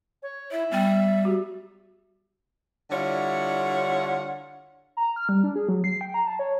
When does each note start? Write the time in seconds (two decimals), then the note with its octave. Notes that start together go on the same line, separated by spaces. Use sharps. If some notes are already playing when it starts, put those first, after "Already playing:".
0.22 C#5
0.51 E4 E5
0.71 G3 B3 G5
1.23 G#3 F#4 G4
2.90 D3 G3 E4 F4 C#5 F#5
4.97 A#5
5.16 F6
5.29 G3
5.44 D4
5.55 G#4
5.69 F#3
5.84 C7
6.01 G5
6.14 A#5
6.27 A5
6.39 C#5